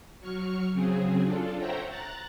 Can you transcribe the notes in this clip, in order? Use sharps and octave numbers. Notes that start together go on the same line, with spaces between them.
F#3 C#6 F6 C#7
C#3 F#3 C4 G#4
D4 F4 A4
C5 C#5 E5 F#5 G5 A#5
A#5 F#6 A6